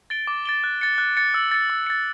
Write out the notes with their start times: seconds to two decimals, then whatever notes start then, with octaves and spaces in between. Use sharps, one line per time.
0.10 A6 D7 G7
0.27 D6
0.45 A6 D7 G7
0.64 F#6
0.81 A6 C#7
0.98 F#6
1.17 A6 C#7
1.34 E6
1.52 A6 C#7
1.70 E6
1.87 A6 C#7